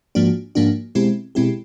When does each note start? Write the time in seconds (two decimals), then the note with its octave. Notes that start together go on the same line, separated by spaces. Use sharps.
0.15 G#2 F3 A#3 D4 F#4
0.55 G#2 F3 A#3 D4 F#4
0.95 B2 G#3 C4 E4 G4
1.35 B2 G#3 C4 E4 G4